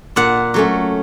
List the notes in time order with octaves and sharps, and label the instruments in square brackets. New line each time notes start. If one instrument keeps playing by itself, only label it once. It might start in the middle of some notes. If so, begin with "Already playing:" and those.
[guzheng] A#2 F#5
F#3 A3 C#4